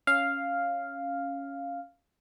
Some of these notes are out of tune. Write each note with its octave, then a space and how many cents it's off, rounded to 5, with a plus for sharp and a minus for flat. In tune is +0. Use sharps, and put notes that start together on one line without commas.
C#4 +0 F5 +0